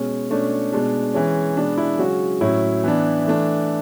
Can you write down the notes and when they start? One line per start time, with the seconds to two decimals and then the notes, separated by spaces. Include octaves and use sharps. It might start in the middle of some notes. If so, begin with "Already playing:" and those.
Already playing: B2 G#3 C#4
0.31 B2 A3 C#4 D4
0.72 B2 G#3 D4
1.14 E3 G#3 C#4
1.57 B2 G#3 B3 D4
1.78 E4
1.98 C#3 F#3 G#3 C#4 F#4
2.41 A2 F#3 C#4 E4
2.84 E3 B3 D4
3.25 E3 A3 D4